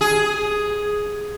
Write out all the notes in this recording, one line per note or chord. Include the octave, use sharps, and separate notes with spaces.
G#4